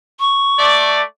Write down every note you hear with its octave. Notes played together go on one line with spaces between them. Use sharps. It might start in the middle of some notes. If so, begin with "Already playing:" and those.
C#6
A3 D5